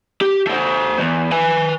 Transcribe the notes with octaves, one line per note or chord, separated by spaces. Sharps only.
G4
A3 C5
E2
B4 G#5